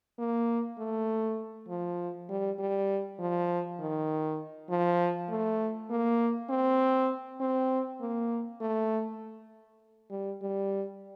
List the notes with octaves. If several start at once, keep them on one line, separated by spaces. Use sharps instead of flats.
A#3
A3
F3
G3
G3
F3
D#3
F3
A3
A#3
C4
C4
A#3
A3
G3
G3